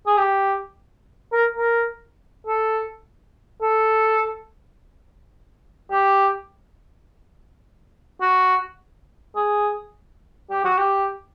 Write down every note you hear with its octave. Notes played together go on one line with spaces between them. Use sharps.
G#4
G4
A#4
A#4
A4
A4
G4
F#4
G#4
G4
F#4
G4